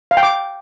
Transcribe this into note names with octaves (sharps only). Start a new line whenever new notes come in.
F5
G5
D6